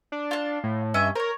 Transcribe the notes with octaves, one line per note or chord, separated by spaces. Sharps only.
D4
F4 A5
A2
G2 C#4 D#5 E5
A#4 C5 C#5